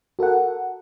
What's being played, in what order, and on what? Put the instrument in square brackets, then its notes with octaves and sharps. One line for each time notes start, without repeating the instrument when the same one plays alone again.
[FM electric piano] F#4 A4 A#4 F#5